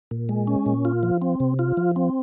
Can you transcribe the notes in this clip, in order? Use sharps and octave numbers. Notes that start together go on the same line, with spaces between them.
A#2
G#3
C#4
A#2
F4
F3
C4
C3
F4
F3
C4